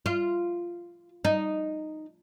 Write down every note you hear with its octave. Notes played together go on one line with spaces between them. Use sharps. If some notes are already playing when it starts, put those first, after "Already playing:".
F4
D#4